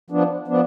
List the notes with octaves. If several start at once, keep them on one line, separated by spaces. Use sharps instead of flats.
F3 B3 D4
F3 B3 D4